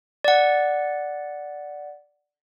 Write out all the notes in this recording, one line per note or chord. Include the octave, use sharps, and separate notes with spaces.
D5 F#5